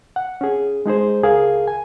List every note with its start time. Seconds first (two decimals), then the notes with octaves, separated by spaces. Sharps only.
0.16 F#5
0.41 C#4 G#4
0.86 G#3 D#4 G#4 C5
1.23 C#2 G#4 A#4 F5
1.68 G#5